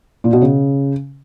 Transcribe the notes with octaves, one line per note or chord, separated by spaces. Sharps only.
A#2
B2
C#3